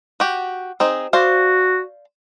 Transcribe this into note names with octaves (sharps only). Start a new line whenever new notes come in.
F#4 G4
C4 D#4 G#4
F#4 C5 D5 F5